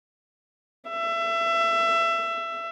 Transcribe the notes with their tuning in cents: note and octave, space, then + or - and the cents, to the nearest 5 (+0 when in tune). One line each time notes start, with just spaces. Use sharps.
E5 +25